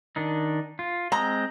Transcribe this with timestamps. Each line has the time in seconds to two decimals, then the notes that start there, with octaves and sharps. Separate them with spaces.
0.16 D#3 D4 D#4
0.79 F4
1.12 G#3 C4 D#5 A#5